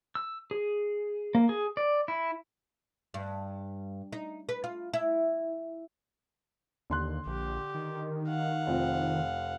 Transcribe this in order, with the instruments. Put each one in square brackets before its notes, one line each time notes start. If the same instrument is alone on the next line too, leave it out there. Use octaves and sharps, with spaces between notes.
[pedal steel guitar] E6
G#4
A#3
G#4
D5
E4
[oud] G2
D#4
B4
F4
E4
[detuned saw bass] D#2 [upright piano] D3 C6 F#6
[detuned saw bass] A#1 [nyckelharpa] G4
[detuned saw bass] D#3
[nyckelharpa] F5 F#5
[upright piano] F1 F3 C4